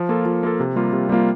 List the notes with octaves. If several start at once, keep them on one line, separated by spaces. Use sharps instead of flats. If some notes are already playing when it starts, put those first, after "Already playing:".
Already playing: F3
A#3 F4 A4
F3
A#3 F4 A4
C3
G3 A#3 F4
C3
G3 A#3 F4